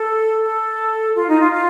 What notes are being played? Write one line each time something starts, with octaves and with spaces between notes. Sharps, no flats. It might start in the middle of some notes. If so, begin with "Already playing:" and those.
Already playing: A4
A4
F4
D#4
F4
F4